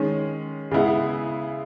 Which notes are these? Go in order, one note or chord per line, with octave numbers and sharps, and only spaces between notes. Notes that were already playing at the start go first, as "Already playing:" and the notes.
Already playing: D#3 G#3 C#4
C#3 G#3 B3 E4